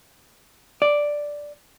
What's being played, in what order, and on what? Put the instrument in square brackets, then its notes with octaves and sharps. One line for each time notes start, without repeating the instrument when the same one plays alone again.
[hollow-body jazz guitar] D5